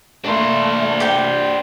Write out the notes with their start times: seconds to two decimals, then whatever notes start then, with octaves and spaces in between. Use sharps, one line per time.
0.25 A3 A#3 D4 C5
1.00 G4 G5